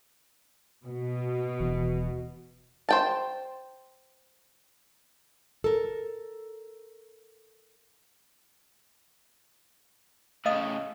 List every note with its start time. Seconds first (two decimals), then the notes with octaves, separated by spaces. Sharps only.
0.85 B2
1.60 D#1 E3
2.89 C5 G5 A5
5.64 A4 A#4
10.46 A2 C#3 D#5 F5 D#6